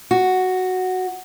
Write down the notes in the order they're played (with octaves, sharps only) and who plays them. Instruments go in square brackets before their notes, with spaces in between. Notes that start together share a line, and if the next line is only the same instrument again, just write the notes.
[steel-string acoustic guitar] F#4